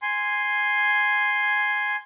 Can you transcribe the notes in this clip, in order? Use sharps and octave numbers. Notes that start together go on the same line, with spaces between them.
G#5 C6